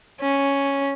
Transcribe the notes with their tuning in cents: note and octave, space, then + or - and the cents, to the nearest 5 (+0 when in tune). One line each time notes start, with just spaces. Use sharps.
C#4 +0